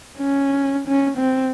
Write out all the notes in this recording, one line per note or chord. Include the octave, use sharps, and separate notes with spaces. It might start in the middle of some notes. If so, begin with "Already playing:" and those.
C#4
C#4
C4